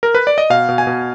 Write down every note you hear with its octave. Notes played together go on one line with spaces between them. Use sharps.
A#4
B4
D5
D#5
B2 F5
B2
G#5
B2